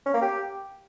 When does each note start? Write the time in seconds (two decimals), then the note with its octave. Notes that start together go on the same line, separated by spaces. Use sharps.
0.06 C#4
0.14 A#3
0.22 G4